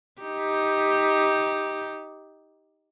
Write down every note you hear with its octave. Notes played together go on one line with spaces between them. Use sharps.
D#4 G4